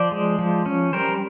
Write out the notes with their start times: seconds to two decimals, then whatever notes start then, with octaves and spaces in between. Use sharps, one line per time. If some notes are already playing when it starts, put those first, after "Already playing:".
Already playing: F3 C5 D5
0.12 G#3
0.39 F3
0.66 C#4
0.93 G3 A#4 C5